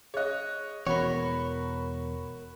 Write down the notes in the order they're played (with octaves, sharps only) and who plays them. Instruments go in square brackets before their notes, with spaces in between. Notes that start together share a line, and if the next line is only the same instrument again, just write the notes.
[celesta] G#4 F#6 [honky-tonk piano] C#5 D#5
[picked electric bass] E1 E2 B3 [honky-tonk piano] F#4 B5 [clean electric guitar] A#4 C#5